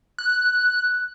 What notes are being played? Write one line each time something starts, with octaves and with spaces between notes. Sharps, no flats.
F#6